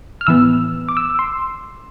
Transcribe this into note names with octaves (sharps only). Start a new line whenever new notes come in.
F6
A2 E3 B3 E6
D6
E6
C6